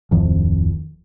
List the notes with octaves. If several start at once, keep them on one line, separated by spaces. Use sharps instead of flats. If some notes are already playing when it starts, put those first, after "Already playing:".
D1 F2 D#3 F3